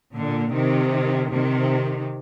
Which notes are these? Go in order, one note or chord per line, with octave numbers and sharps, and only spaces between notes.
A#2 D3
C3 D#3
C3 D#3